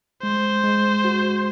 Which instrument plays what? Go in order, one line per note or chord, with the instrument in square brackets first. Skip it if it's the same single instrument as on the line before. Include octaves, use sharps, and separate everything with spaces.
[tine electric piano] G#3 [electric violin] C5
[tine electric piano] G#3
F#4